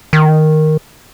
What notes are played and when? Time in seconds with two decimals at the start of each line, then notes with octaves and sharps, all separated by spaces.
0.13 D#3